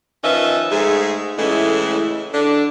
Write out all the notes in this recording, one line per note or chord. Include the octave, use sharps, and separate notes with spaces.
D#3 F3 C#4 B4 D#5 E5
G#2 A3 G#4
A2 C#3 E3 G#3 A3 E4
D3 D4